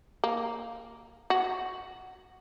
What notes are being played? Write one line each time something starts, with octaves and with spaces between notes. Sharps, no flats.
A#3
F#4